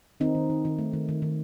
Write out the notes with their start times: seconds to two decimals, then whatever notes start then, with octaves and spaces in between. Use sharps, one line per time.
0.20 D#3 C4 D#4
0.35 D#3
0.50 D#3
0.65 D#3
0.79 A3
0.93 D#3
1.09 D#3
1.22 D#3